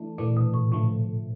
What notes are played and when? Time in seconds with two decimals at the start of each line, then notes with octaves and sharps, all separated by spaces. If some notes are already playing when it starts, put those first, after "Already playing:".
Already playing: E3 A3 D4
0.18 A#2 E3 A3 D4
0.37 B2
0.54 A2
0.72 A2 D3 F3 A3